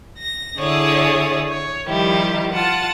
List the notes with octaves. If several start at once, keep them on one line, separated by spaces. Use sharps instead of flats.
A#6
D3 E4 G#4 C#5 D5 D#6
C#5
D#3 F3 G3 E4 G4
F4 F#5 A5